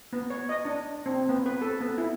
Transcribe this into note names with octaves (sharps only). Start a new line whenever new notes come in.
B3
C#5
D#5
D4
C4
B3
B4
A4
B3
E4